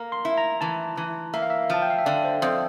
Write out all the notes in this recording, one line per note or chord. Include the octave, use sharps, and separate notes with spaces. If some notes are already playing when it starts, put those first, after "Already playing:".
Already playing: A#3 A#5
C6
E4
A#5
E3 A5
E3
A#3 E5
F5
E5
F3 A5
G5
F5
E5
D3 D5
C5
F2 C5